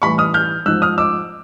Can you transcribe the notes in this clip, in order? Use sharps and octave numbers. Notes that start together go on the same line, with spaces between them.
A2 E3 G3 B5 C#6
D#6 F6
F6 G6
G#2 F3 E6 F#6
D#6 F6
D6 E6